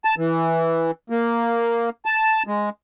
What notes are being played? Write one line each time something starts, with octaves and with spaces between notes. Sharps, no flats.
A5
E3
A#3
A5
G#3